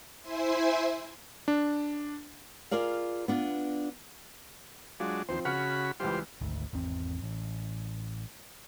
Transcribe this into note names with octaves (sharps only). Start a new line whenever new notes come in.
E4 C5 E5 G#5 C6
D4
F4 G#4 A#4 D5 F5
B3 D4 F4
F#3 G#3 D4 F4
D#2 F3 C4 C5
C#3 F#4 F#5 B5 F6 C#7
C#2 E3 G3 F4 G4 C5
G#1 D2
G#1 E2 C4
A1